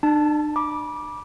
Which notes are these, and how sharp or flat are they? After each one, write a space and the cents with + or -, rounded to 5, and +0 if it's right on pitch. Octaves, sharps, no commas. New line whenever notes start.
D4 +40 A5 +0
B5 -30 D6 +0